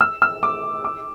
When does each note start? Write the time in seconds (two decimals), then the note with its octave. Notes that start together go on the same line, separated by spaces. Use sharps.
0.01 E6
0.22 E6
0.43 D6
0.84 D6